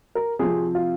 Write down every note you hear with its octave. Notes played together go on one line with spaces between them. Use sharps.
A#4
C3 F3 C4 G#4
F4